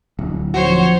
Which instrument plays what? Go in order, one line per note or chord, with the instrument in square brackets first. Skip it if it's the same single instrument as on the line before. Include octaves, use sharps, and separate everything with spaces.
[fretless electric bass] D1
[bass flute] F3 [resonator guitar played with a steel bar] F#4 [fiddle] C5 C#5